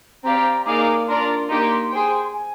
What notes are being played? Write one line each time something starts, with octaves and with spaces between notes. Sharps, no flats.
C4 G4 D5 F5 A#5
A#3 D#4 G#4 D5 F5 D6
D6
D4 F4 A#4 D5 C6
A#3 D#4 G4
G#4 C5 G5
G#5